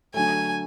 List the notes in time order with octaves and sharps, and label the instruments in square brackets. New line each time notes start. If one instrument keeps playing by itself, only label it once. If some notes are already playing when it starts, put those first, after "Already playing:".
[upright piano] D3 F#3 A3 [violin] G#5